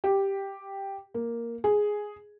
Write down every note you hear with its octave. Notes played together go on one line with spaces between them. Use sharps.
G4
A#3
G#4